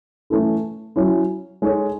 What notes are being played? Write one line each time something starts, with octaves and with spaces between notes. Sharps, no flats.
E3 A3 C#4 E4 A4
F#3 C#4 E4
G#3 D#4 A4 C#5